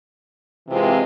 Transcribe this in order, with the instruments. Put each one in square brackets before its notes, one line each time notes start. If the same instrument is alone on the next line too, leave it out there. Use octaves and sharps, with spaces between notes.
[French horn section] C3 E3 G#3 C4 F4